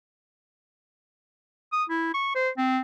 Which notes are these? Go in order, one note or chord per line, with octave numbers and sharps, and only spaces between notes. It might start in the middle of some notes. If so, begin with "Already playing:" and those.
D#6
E4
C#6
C5
C4